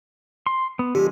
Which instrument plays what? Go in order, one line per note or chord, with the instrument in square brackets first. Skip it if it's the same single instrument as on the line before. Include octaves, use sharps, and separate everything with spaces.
[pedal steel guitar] C6
B3
[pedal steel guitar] D3 F3 G#3 [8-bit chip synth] G4